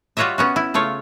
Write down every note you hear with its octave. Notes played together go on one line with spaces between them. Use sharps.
G3 F4 F#4 C#5 D#5 E5
B3 C#4 F#4
E4
C#3 A3 F4 C#5